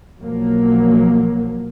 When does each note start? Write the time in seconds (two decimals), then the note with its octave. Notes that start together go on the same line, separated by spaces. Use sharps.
0.19 B1 F3 F#3 A#3